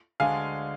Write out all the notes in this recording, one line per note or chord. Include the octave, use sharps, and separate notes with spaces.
D2 D3 G#3 D4 F5 G#5